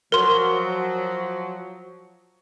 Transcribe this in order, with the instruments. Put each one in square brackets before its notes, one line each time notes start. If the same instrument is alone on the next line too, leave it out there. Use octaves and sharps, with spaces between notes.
[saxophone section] F3 F#3 [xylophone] A#4 C6